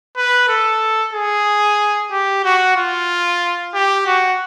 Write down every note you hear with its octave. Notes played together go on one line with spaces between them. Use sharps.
B4
A4
G#4
G4
F#4
F4
G4
F#4